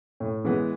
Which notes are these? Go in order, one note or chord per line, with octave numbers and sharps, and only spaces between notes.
A2
E3 G#3 B3